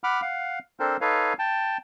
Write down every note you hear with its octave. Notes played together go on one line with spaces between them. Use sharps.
F#5 B5 D6 F6
F5 F#5
C4 D4 A4 A#4 C5
D#4 A4 B4 C#5 F5
G5 A5